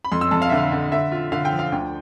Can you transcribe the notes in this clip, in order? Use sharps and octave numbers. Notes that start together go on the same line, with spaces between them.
B5
F2 C6
E6
F2 A5
F5
D3 E5
F5
D3
D3 E5
F4
D3 F5
G5
F3
F5
D2 G5